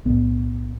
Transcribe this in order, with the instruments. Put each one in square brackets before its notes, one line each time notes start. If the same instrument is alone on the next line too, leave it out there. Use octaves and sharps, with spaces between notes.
[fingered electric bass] B1 A2 B3